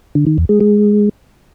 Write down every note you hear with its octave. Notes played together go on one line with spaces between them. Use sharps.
D3
D#3
E2
G#3
G#3